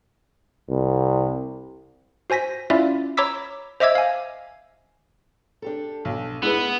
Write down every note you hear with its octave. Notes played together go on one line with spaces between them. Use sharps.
C2
F#4 C5 G#5 A#6 B6
C#4 E4 F4 D5 E5 F5
C#5 A#5 B5 D6 E6 B6
C5 D#5 E5 D6 E6 G#6
F5 G#5
D4 G4 A4
B1
G#3 B3 E4 G#4 B4